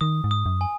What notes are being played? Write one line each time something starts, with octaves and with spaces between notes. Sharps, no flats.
D#3 D#6
G#2
D#6
F#2
G#5